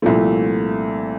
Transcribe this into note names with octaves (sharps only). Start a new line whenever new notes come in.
C2 A#2 F3 A3